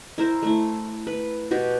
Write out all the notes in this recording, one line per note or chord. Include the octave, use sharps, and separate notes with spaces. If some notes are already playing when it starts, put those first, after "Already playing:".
E4 A#4 C5
A3 E4
B4
B2 F#4 G4